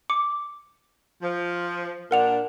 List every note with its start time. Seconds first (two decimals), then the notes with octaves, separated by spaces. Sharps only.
0.10 D6 C#7
1.22 F3
2.11 A#2 D4 A#4 F#5 F7